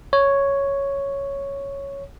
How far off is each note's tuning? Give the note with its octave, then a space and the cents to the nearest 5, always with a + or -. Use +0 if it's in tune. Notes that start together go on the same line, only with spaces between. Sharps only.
C#5 +0